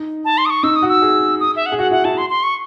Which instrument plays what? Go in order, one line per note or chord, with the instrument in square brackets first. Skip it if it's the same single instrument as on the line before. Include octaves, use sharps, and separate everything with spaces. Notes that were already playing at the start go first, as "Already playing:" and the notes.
Already playing: [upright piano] D#4
[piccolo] A5
C6
D#6
C#6
[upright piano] D#4 [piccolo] E6
[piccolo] D#6
[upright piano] F#4
[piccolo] E6
[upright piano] G#4
[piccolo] D#6
E5
F#5
[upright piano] G#4
[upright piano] F#4 [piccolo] F#5
[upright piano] E4 [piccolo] F#5
[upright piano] E4 [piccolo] A5
[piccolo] C6
C6
C#6